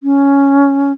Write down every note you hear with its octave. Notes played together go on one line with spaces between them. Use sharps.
C#4